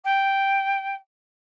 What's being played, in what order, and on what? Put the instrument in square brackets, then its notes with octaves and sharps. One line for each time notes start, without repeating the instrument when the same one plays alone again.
[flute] G5